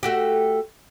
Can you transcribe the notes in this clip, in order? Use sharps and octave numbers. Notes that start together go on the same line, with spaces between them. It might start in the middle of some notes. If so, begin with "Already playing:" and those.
A3 F#4 G4